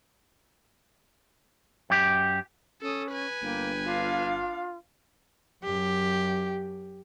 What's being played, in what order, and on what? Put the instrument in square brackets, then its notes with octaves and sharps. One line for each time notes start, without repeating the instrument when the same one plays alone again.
[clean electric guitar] F#2 G4
[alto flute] C#4 [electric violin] A4 D#6
[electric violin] B4 G#5
[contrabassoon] G1 [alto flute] A#3 [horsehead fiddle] G5
[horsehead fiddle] D4 F5 [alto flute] F4
[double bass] F#2 [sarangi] G4